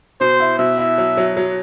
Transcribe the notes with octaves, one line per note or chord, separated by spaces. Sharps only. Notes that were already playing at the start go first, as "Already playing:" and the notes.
B2 C5
E4
B2 E5
E4
F#3
F#3
F#3